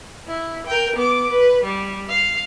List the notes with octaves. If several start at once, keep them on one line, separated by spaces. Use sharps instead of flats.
E4
A#4 G5
B3 D6
B4
G3
F5